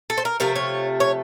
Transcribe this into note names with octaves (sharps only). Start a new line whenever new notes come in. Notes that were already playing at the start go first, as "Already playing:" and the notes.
A4
C5
A#4
C3 F3 A3 A#4
C#5
C#5